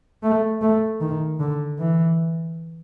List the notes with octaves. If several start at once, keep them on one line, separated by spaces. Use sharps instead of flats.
A3
A3
D#3
D3
E3